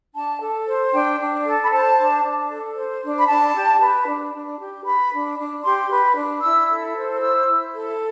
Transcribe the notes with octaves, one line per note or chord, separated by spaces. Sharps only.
D4 A5
A4
C5
D4 G5
D4
A4
B5
C5 A5
D4
D4
A4
C5
D4
B5
D4 A5
G4
B4
D4
D4
G4
B4 B5
D4
D4
G4 C6
B4
D4
E4 E6
A4
C5
E4 E6
E4
A4